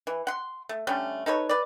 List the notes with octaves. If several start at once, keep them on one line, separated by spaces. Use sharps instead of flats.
E3
F#5 C6
A3
D3 G3 A3 C#4
D#4 A4 B4 C#5
B4 D5